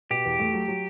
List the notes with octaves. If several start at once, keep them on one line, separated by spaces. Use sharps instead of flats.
B2 G4
E2
A3
F#3
F#3